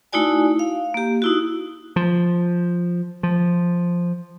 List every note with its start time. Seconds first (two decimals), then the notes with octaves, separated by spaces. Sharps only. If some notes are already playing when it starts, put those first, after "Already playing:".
0.13 A3 D#4 E4 F#4 D5 G#5
0.59 F5
0.94 A#3 G4
1.22 D#4 E4 F#4
1.96 F3
3.23 F3